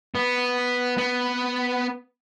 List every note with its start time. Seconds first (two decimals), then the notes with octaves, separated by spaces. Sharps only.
0.15 B3
0.98 B3